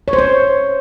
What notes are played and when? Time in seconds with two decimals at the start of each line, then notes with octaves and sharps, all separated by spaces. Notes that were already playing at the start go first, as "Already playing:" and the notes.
0.08 C#5
0.13 C5
0.19 C#5